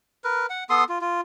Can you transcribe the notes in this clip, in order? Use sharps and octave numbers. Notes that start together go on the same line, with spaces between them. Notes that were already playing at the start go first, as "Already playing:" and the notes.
A#4 B4
F#5
B3 A4 C6 D#6
F4
F4